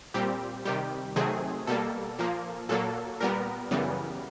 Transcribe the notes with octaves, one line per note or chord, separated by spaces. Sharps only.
A#2 G3 C4 G4
C3 D#3 G3 G4
C3 D#3 F#3 A3 C4 G#4
B2 G3 A#3 A4
A#2 F3 A#3
A#2 F#3 A#3 A4
A#2 G3 B3 A#4
F#2 C#3 E3 G3 B3